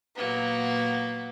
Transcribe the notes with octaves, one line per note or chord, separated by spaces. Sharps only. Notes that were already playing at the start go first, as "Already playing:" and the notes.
A#2 F#3 A#3 B3